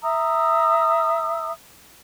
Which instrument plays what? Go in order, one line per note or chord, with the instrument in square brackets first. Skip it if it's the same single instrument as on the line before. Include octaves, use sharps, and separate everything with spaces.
[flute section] E5 A#5 D#6 E6